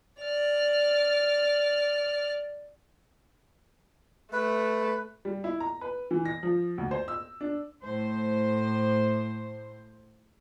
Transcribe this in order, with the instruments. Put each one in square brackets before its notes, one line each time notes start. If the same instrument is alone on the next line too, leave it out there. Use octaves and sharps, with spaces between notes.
[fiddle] D5 F6
[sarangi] A3 [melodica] B4
[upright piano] G3
E4
A#5
B4
E3
A#6
F3
D2
C5
E6
D4
[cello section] A2 C5